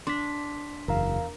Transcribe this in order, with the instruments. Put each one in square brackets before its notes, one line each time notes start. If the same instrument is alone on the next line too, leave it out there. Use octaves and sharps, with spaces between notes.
[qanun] D4 [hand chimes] C6 B6
[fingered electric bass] F#1 [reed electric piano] E2 F5 [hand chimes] A#4 A#5